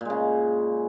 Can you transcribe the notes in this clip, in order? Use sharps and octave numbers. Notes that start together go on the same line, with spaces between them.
A#2 C#3 G#3